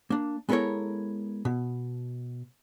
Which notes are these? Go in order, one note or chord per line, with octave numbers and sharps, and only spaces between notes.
A#3 D4
G#3 B3 E4 A4 A#4 C#5
B2